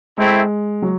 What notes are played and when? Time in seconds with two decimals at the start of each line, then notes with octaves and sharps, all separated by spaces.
0.18 G#3 A3 C4 E4
0.82 F#3